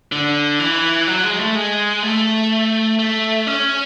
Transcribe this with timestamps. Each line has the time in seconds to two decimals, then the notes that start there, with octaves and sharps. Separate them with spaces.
0.12 D3
0.59 E3
1.08 F#3
1.24 G#3
1.40 A3
1.56 G#3
2.03 A3
2.99 A3
3.47 C#4